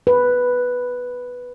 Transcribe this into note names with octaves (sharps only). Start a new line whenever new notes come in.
B4